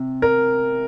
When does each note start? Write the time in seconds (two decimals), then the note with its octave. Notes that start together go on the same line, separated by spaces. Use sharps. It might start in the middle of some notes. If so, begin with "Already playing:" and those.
Already playing: C3
0.22 A#4